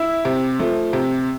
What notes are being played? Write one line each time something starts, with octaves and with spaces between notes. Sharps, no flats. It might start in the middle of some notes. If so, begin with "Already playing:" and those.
Already playing: E4
C3
F3 A3
C3